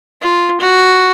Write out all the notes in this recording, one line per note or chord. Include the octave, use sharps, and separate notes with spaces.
F4
F#4